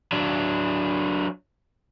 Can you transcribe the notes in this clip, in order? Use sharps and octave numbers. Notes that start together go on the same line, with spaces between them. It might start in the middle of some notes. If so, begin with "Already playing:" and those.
F#3 D4